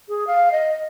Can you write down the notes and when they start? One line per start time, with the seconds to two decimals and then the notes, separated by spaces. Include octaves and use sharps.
0.09 G#4
0.27 F5
0.52 D#5